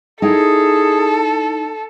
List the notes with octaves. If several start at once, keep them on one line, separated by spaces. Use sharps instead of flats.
D#4 E4 G#4 A4 G5